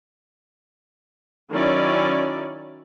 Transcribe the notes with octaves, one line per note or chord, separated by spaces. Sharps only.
D#3 F#3 C#4 E4 D5